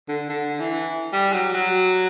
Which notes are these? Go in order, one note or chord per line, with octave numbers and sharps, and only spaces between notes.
D3
D3
E3
G3
F#3
F#3